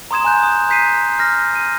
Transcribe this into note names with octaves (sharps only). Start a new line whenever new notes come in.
A#5 C6 D#6 G#6 E7
G#5 A#5 F#6 G6
D#6
A#5 G6 B6 C7 D#7
F6 A#6
D#7